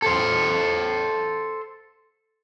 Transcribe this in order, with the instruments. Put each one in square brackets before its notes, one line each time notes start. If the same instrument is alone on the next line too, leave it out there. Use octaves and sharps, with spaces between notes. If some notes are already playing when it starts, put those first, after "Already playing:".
[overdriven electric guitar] A4 C5